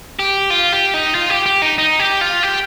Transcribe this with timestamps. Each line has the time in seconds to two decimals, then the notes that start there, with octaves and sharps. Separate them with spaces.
0.19 G4
0.50 F4
0.73 G4
0.94 D#4
1.15 F4
1.30 G4
1.46 G4
1.62 D#4
1.78 D#4
1.99 G4
2.21 F4
2.43 G4